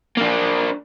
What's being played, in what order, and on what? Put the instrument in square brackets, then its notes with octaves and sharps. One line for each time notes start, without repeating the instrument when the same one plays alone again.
[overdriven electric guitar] A#3 D4